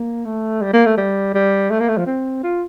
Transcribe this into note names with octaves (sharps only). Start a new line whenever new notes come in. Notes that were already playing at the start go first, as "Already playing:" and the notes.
Already playing: A#3
A3
G3
A#3
A3
G3
G3
A3
A#3
A3
F3
C4
F4